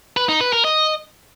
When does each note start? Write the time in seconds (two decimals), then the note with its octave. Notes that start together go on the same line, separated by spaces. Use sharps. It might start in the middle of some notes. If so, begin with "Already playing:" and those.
0.17 B4
0.29 D#4
0.41 B4
0.53 A#4
0.65 D#5